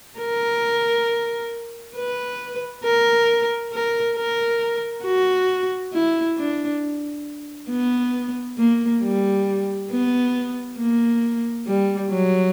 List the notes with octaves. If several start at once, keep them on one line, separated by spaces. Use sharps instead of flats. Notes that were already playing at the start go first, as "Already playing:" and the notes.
A#4
B4
A#4
A#4
A#4
F#4
E4
D4
B3
A#3
G3
B3
A#3
G3
F#3